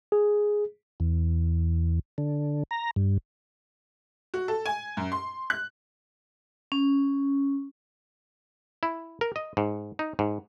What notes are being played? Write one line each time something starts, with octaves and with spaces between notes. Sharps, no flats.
G#4
E2
D3
A#5
G2
F#4
A4
G#5
F#2
C6
F#6
C#4
E4
A#4
D#5
G#2
D#4
G#2